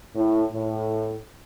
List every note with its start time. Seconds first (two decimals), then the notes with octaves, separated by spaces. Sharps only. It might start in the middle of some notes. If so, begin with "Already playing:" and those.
0.15 A2
0.53 A2